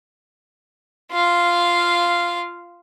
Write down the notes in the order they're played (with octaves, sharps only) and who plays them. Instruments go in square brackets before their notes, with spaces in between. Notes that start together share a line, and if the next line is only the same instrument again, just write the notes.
[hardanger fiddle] F4 F5